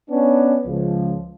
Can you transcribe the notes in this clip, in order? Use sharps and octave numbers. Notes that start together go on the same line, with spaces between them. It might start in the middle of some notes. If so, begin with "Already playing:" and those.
B3 C#4 D4
C#2 F3